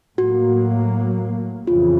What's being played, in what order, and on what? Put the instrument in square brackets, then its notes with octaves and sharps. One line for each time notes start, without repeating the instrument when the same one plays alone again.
[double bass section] A2 F#3 A#3 [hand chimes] F#4
[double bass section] F2 C#3 E3 [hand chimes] F4